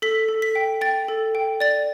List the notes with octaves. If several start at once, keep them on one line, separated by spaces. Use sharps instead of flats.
A4 B6
A4
B6
G5
G5 A6
A4
G5
D5 A6